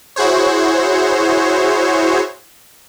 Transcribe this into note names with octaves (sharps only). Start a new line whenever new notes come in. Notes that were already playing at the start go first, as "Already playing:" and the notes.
E4 F#4 G#4 C5 C#5